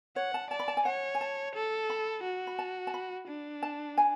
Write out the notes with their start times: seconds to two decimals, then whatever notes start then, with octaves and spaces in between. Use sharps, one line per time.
0.16 C#5 F#5
0.34 A5
0.50 D5 A5
0.59 B5
0.68 A5
0.77 G#5
0.85 C#5 F#5
1.15 G#5
1.21 A5
1.55 A4
1.90 B5
2.23 F#4
2.47 B5
2.59 A5
2.87 A5
2.94 B5
3.28 D4
3.62 A5
3.97 G#5